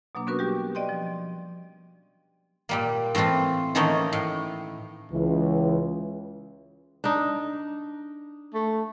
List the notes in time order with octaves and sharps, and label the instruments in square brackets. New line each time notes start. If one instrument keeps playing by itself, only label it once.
[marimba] B2 F#3 A#3 D4
B3 C#4 D4 F#4 A#4 B4
G3 G4
D5 D#5 G5 C6
F3
[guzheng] A#2 G3 A#3
A2 E3 A3 C4 F4
D#3 E3 A3 A#3 C#4 D#4
A2
[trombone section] C#2 E3
[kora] D4 D#4
[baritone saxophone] A3